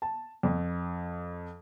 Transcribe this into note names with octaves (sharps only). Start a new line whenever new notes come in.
A5
F2